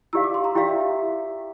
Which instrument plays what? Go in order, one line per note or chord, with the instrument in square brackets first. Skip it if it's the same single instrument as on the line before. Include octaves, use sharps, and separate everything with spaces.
[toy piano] E4 G4 D5 F5 [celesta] E6
[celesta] D6
C6
A#5
[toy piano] E4 G4 D5 F5 [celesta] G5
[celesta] E5